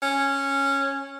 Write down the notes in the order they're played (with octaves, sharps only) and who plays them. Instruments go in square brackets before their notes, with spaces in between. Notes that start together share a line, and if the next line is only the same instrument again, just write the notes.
[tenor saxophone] C#4